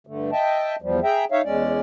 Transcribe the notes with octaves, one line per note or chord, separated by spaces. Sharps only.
G2 D3 A3
D#5 E5 G5 A5
E2 F3 G3
G#4 E5 G5 A#5
D#4 C#5 E5 F5
E2 G#3 C#4 D5